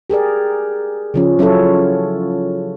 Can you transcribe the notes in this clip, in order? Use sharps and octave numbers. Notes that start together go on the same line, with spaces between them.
G4 G#4 A#4 D5
C#3 F3 C#4
F#3 C#4 E4 F4 A4 C#5